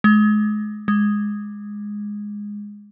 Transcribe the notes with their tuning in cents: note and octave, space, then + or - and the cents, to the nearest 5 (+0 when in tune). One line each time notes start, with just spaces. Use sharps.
G#3 +35
G#3 -5